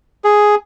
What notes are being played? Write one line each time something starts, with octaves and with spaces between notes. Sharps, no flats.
G#4